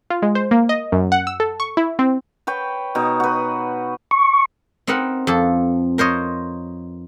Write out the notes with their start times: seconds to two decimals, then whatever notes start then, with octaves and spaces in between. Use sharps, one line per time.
0.10 F4
0.22 G#3
0.35 C5
0.51 A#3
0.69 D#5
0.92 F#2
1.12 F#5
1.27 E6
1.40 A4
1.60 C#6
1.77 E4
1.99 C4
2.47 B4 C#5 G5
2.95 B2 D#4
3.20 F#4 B4
4.11 C#6
4.87 C4 D#4 A#4 B4 F#5
5.27 F2 A4
5.98 A#4 C5 C#5 D#5